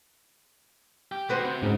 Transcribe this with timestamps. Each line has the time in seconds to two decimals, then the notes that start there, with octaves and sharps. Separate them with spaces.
1.12 G4
1.29 C3 D#3 F#4 B4 C5
1.44 C3
1.62 G#2 C#3